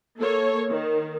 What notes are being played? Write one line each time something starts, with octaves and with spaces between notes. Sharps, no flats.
A#3 A4 C#5
D#3